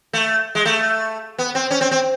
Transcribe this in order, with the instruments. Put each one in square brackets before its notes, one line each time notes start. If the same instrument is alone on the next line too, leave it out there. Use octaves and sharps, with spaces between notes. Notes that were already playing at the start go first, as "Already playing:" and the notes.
[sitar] A3
G#3
A3
B3
C4
C#4
C4
C4